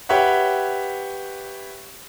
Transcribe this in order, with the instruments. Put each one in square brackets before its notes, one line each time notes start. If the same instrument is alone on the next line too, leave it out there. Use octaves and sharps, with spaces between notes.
[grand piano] G4 B4 C#5 E5 F#5